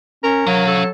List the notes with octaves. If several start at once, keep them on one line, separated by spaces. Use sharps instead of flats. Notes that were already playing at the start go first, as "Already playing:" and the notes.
C#4 A#4
F#3 C#4 F5
A4